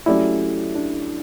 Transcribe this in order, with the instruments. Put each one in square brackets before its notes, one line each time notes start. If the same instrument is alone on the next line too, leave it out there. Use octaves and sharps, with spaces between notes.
[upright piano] F#3 A3 C#4 G4 D5 [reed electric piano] E4
[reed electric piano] D4